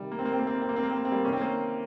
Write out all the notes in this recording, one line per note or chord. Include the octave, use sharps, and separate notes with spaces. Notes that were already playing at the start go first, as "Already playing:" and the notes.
Already playing: C3 D#3 G3
A#3
C4
A#3
C4
A#3
C4
A#3
C4
A#3
C4
A#3
C4
A#3
C4
G3 A#3
C3 D#3 C#4
C4
A#3 C#4